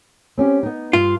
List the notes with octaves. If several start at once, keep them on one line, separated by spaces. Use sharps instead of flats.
C4 C#4 G4
B3 D#4
G2 F4